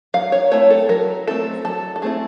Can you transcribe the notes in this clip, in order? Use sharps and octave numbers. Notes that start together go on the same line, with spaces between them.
F#3 F5
C#5
A3 C4 E4 C#5
A4
F#3 A#4
A3 C4 E4 A4
F#3 A4
A4
A3 C4 E4 G#4